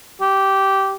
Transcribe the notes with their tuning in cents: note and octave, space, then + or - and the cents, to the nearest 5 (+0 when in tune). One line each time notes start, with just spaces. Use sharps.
G4 -15